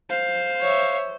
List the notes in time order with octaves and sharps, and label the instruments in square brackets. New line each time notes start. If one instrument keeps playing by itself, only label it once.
[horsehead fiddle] C5 [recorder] F5
[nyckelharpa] C#5 E5